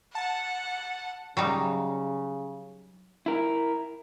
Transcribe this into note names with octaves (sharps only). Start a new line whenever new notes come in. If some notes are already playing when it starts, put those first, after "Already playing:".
F#5 A5
C#3 F#3 G3 D#4
E4 A#4